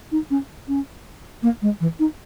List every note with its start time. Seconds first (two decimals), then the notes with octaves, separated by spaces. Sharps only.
0.12 D#4
0.30 C#4
0.68 C#4
1.43 A#3
1.62 G#3
1.81 E3
1.99 D#4